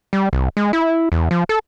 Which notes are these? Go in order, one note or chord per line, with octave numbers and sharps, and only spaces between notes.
G3
C2
G#3
E4
E2
F3
A4